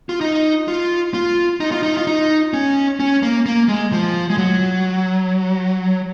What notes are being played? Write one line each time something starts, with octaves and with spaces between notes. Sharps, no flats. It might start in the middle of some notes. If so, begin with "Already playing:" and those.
F4
D#4
F4
F4
D#4
F4
D#4
F4
D#4
C#4
C#4
A#3
A#3
G#3
F3
G#3
F#3